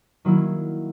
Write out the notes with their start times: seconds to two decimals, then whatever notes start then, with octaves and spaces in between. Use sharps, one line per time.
0.25 D#3 F#3 A#3 E4